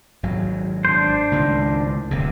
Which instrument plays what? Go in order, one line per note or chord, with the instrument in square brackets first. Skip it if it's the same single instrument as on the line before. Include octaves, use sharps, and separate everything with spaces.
[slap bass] G#1 F#3
[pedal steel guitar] D4 C5
[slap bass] C#2 A2 D#3
D1 C3